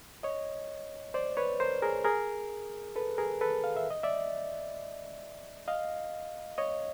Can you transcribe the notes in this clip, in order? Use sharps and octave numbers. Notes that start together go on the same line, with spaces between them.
C#5 D#5
C5 D5
B4 C#5
A#4 C5
G#4 A#4
G#4 A#4
A4 B4
G#4 A#4
A4 B4
F5
E5
D#5
D5 E5
D#5 F5
C#5 D#5